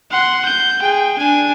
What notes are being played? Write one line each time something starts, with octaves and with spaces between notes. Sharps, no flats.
F#5 C6
G6
G#4 G5
D4 G#5